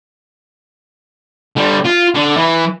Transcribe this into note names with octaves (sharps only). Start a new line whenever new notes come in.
D3 G3
F4
D3
E3